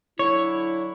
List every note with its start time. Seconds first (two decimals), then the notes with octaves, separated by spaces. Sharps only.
0.19 D3 F#3 E4 C#5